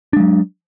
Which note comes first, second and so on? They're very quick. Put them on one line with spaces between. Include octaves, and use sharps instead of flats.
D4 G#3 F#3